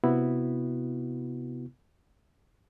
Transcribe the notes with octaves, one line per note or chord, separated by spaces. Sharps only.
C3 B3 E4 F#4